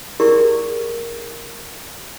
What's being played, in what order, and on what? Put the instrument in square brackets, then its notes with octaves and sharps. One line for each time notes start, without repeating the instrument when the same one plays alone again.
[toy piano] E4 G4 G#4 A#4 D5 C#6